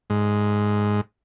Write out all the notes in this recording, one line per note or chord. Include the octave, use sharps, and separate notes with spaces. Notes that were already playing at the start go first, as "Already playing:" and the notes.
G#2